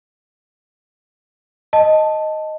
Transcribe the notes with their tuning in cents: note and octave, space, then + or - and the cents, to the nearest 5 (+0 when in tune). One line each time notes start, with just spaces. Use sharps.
D#5 +0 A5 +0